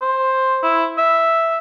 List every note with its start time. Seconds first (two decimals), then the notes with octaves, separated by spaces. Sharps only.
0.02 C5
0.63 E4
0.98 E5